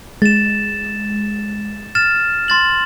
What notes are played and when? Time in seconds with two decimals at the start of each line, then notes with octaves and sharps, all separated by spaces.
0.22 G#3 A6 E7
1.95 F6 A6 E7
2.48 C6 A6 F#7